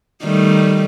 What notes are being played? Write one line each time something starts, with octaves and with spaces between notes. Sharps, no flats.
D#3 G3 A3